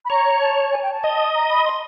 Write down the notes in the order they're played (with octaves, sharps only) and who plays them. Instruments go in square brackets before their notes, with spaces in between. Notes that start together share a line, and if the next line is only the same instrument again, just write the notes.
[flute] B5
[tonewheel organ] C#5 [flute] A#5
[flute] A5
G#5
G5
A5
[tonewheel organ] D#5
[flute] A#5
B5
C6